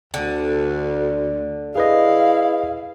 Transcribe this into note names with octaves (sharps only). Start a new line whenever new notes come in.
D2 D3
E4 G#4 B4 D#5 F5